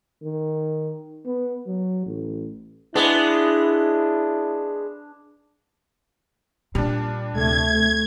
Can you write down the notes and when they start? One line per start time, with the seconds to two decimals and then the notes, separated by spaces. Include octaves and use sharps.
0.23 D#3
1.25 B3
1.67 F#3
2.06 A1
2.95 G#3 B3 D4 E4
6.75 A#2 G3 D4
7.33 D2 C3 A3 G#6